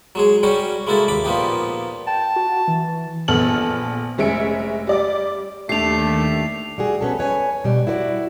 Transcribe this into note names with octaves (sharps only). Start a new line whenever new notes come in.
F#3 G#3 G#4
G3 C#4 F#4 G4 C#5
G#3 A#3 E4 F#4 A4
D#2 B5 D6
A#2 F3 A#3 B3 D#4 G4
G5 A5
F#4
E3
A#1 B3 A4 F6 F#7
F1 G#3 C#4 E5 C#7 D7
G3 D5 D6
D#2 A3 D4 G4 C7 F7
G3 F#4 G#4
B3 C#4 A4
B4 C#5 D#5 G#5
B2 G3
E4 F#4 B4 D5